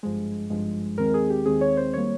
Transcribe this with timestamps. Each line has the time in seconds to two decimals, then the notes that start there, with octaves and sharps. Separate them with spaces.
0.03 G#1 G2 F3 G#3
0.50 G#1 G2 F3 G#3
0.98 D#2 D#3 G#3 C4 A#4
1.14 G#4
1.30 G4
1.46 D#2 D#3 G#3 C4 G#4
1.61 C#5
1.77 C5
1.94 D#3 G3 A#3 C#5